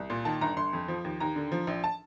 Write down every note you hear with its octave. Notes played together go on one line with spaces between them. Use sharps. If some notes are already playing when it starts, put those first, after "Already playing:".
Already playing: C2
A#2
D#3 A5
G1 A#5
G1 C6
F2
F3
D#2
D#2 A#5
D3
F3
A#1
A5